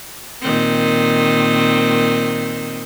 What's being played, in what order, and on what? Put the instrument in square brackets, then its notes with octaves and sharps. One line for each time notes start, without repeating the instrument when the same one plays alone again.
[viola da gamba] A#2 D#3 C4